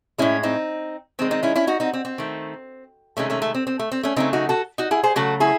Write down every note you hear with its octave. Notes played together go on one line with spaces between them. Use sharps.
A2 G#3 C#4 E4
C4 D#4
D#3 G#3 C4
C4 D#4
C#4 E4
C#4 E4
D#4 F#4
C4 D#4
C4
C4
D#3 A3
C3 D#3 G#3 A3 C#4
A3 C#4
A3
C4
C4
A3
C4
A3 C#4
C#3 F#3 A3 C4 D#4
D#4 F#4
F#4 A4
D#4 F#4
E4 G#4
G#4 C5
C#3 F#3 A3 F#4 A4
E4 G#4